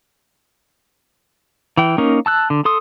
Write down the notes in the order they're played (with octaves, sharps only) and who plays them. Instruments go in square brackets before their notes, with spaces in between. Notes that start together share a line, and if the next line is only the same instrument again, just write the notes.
[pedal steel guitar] E3 G5
A#3 C#4 D#4 A#4
A5 E6 F#6
D3
A4 C6 D#6